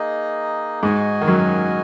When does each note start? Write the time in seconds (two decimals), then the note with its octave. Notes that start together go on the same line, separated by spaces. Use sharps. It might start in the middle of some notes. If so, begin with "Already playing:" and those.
Already playing: A#3 D#4 G#4 D#5
0.82 G#2 G#3 F#4 D#5 G#5
1.21 D#3
1.27 F#2 F#3